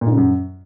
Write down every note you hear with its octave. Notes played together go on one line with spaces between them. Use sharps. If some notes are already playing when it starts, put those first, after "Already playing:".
A#2
G#2
C#3
F#2